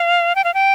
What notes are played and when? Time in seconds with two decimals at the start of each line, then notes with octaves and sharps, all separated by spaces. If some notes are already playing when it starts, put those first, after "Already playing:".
Already playing: F5
0.35 G5
0.44 F5
0.54 G5